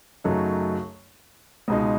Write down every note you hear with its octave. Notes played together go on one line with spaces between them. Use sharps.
F#2 C#3 F#3 A3 D#4
C#2 B2 G#3 D#4